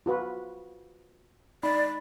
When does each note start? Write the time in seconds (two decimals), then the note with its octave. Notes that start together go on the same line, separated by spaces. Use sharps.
0.06 F4 F#4 B4
1.63 D#4 D5 B5